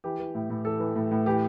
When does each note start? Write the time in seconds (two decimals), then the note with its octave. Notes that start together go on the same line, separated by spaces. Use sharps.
0.04 E3 G4
0.20 E3
0.35 A2
0.50 A2
0.65 E3 A4
0.80 E3
0.96 A2
1.11 A2
1.26 E3 G4